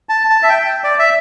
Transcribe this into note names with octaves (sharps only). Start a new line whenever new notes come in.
A5
A5
E5
G5
D5
E5